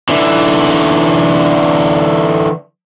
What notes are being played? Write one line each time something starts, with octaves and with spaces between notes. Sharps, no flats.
D3 E3